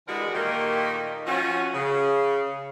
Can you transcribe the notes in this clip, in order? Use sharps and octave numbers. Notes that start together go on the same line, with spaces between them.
D3 E3 G3 G#3 F#4 A#4
A#2 D#3 A3 A#3 D#4 G4
F3 C#4 F#4
C#3